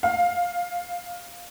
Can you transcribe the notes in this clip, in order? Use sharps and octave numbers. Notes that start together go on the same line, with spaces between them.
F5